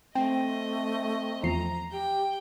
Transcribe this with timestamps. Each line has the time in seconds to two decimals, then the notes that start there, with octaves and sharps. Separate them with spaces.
0.15 A3 C4 D#5 G5
1.43 E2 F3 A#5 C7
1.92 G4 G5